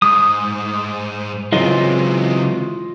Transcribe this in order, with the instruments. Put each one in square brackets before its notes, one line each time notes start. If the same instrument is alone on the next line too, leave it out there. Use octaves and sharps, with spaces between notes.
[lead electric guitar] G#2 [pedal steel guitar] D#6
[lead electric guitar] C#3 C4 [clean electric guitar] E3 F#3 G#3 [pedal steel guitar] F4 D#5